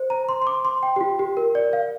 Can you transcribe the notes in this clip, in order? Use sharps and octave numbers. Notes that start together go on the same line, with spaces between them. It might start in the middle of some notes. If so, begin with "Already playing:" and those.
Already playing: C5
A#5
C6
C6
D6
C6
G5
G4
F4
G4
A#4
D5
F5